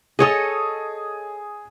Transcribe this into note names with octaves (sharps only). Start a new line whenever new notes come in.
G#4 A4 C#5 D#5 D#6